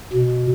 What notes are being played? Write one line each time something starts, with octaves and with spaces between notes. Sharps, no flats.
B2